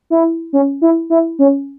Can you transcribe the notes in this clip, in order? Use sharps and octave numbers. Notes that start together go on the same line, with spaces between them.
E4
C#4
E4
E4
C#4